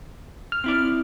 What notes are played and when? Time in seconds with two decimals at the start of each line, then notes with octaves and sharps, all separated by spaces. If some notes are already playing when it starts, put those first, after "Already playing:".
0.52 F6
0.64 C4 E4 D5